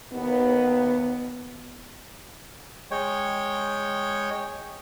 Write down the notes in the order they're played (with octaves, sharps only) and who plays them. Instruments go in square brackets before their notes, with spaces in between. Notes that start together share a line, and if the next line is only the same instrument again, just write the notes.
[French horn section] D#2 B3
[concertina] G#3 C#5 G5